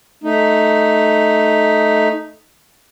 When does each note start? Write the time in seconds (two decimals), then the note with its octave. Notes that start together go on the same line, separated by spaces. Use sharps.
0.24 A3 D#4